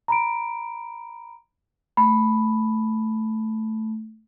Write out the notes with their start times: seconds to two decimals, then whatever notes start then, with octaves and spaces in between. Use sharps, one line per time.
0.08 A#5 B5 D7
1.97 A3 B5